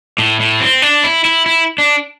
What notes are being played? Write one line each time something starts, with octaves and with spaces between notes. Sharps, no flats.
A2
A2
C4
D4
E4
E4
E4
D4